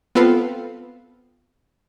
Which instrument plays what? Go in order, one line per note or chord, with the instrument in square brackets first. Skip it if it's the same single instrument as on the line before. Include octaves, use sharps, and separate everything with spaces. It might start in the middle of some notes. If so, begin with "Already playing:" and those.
[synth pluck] B3 C4 F4 A4 B4 F5